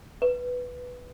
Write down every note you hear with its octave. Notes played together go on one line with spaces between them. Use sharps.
B4